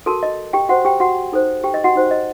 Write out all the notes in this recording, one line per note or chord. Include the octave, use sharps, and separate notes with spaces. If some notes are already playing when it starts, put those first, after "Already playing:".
F#4 A4 A#4 A5
D#5
G4 G5
F#4 C5 F#5
G4 G5
F#4 F#5
D#4 A4 C5
G4 G5
D#5
F#4 F#5
D#4 F#4 C5
D#5